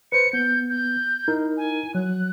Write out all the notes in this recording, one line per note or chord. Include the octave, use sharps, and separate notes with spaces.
B4 C5 C#7
B3 G6
G6
D#4 E4 A#4
G#5
F#3 F#6